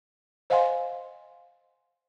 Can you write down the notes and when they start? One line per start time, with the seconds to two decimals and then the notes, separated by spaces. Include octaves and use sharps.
0.50 C5 D#5 F5 F#5 G#5 C6